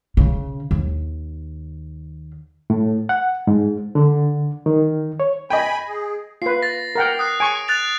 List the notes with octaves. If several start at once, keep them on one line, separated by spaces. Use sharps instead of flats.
C#3
D#2
A2
F#5
G#2
D3
D#3
C#5
D#5 G5 G#5 B5
G#4
F4 B4 C7
A6 A#6
A#4 F#5 G5
D#6 F#6 C7
G#5 C#6 D7
F#6 A6 F7